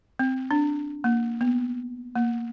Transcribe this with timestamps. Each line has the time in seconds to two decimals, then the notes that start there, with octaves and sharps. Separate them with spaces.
0.19 C4
0.51 D4
1.04 A#3
1.41 B3
2.15 A#3